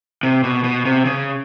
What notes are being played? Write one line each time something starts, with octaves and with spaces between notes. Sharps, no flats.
C3
B2
B2
C3
C#3